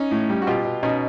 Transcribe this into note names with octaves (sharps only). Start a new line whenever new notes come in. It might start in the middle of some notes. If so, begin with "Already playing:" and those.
Already playing: C#4 D#4
A2
G3
F#4
B2 F4 G4
B2
B2 C#4 D#4